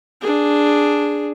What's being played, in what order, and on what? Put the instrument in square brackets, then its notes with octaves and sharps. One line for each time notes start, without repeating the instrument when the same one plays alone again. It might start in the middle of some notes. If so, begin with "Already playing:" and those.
[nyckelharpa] D4 G#4